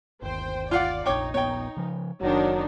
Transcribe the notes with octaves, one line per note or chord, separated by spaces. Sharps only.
G1 D#2 C5 G5
F4 D5 F5 F#5
F1 A#1 D#4 C#5 G5 D6
D#1 A#1 B3 C#5 G5
C#3 F3
F#1 D#3 F#3 D4 D#4